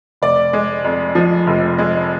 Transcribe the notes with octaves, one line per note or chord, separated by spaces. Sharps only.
F1 D5
G#3
F2
F3
F1
G#3